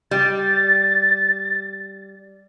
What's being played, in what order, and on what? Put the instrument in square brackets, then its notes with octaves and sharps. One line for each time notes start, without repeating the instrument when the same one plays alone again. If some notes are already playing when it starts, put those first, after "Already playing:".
[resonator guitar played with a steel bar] G3 [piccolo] A6